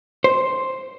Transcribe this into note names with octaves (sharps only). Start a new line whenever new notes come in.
C5